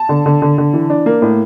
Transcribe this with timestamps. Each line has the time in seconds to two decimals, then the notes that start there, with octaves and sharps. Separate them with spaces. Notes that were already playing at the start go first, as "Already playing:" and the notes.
Already playing: A5
0.09 D3
0.26 D3
0.42 D3
0.58 D3
0.73 E3
0.90 D4
1.06 A#3
1.22 A2